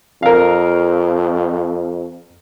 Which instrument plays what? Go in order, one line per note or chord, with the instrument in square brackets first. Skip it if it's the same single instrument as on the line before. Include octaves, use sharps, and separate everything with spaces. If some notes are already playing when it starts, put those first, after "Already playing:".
[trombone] F2 [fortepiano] A#4 F5